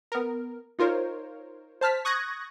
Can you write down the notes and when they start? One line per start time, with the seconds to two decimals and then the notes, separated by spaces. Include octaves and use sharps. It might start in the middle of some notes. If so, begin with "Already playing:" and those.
0.12 B3 A#4
0.79 D#4 F4 A#4 C5 C#5
1.81 C5 A5 F6 B6
2.05 C#6 D#6 F#6 G#6 A#6